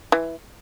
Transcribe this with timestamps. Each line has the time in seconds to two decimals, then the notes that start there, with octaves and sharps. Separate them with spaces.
0.12 E3